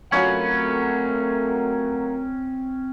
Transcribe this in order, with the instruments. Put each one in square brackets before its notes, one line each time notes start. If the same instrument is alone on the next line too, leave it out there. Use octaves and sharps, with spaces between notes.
[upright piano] F#3 F4 F#4 [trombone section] A3 A#4 [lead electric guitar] C4 B5 [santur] C#4